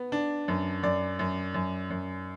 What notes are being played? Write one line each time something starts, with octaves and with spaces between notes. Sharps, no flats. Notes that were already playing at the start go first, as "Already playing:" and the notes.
Already playing: B3
D4
F#2
F#2 D5
F#2
F#2
F#2